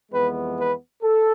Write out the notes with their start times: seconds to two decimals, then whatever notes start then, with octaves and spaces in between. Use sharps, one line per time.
0.12 F2 E3 G#3 B3 B4
0.58 B4
1.03 A4